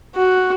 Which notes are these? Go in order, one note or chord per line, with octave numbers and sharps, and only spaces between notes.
F#4